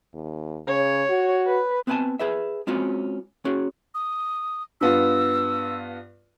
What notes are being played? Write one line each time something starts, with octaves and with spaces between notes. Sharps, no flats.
D#2
C#3 C#5
F#4
B4
B3 C4 B4 F5 G#5 A5
G#4 B4 E5
G#3 C4 C#4 F4 F#4
C#4 F#4 G#4
D#6
G2 B3 F4 E6